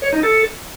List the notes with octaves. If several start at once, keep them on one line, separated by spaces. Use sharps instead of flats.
C#5
D#4
A4